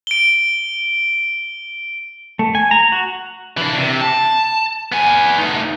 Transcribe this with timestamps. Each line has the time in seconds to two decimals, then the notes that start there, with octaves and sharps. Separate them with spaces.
0.07 D7 G7
2.39 A3
2.55 G#5
2.71 A#5
2.92 F#4
3.57 E3 D4
3.78 C3
4.01 A5
4.92 B3 G#5
5.38 A3 D#4